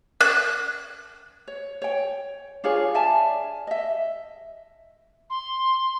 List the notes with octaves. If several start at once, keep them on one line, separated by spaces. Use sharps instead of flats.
F#6
C#5
C#5 G5
D4 F4 G#4 C#5
D5 E5 G#5 A5
D#5 E5
C6